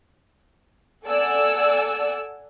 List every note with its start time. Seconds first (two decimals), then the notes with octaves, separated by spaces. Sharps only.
1.04 A4 D5 F#5 G#5 E6